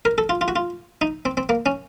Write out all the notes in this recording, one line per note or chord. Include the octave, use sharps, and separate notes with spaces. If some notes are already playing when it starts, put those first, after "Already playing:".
A#4
A4
F4
F4
F#4
F4
D#4
C4
C4
A#3
C#4